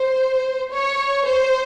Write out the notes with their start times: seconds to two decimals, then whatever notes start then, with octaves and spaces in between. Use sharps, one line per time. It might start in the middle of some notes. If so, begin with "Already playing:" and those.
Already playing: C5
0.73 C#5
1.27 C5